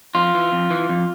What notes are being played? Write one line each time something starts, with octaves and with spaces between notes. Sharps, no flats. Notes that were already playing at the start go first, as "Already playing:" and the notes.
F2 F4
E3
F2
E3
F2